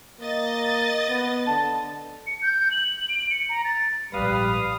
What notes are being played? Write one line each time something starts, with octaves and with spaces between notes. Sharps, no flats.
A#3 D#5 A6
B3
D3 A5
C#7
G6
F#7
D7
C#7
A#5
A6
A#1 G#2 G3 B4 F5 D#6